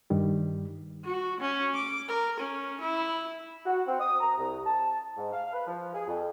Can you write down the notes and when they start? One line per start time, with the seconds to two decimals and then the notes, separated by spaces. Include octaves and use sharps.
0.10 G2 D#3 G3
1.05 F#4
1.40 C#4
1.75 D6
2.08 A#4
2.40 C#4
2.81 E4
3.66 F#4
3.87 C4
4.00 D#6
4.20 A#5
4.37 C2
4.65 A5
5.17 G#2
5.32 F5
5.53 B4
5.67 F3
5.95 G#4
6.07 F2